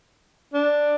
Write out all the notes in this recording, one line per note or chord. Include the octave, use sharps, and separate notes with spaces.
D4